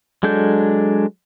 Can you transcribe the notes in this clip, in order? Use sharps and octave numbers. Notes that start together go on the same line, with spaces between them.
F#3 G#3 D4 A4 G6